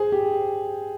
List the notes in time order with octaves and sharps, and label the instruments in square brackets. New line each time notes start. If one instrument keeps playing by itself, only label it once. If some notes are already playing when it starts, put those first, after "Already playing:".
Already playing: [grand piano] G#4 C5
G4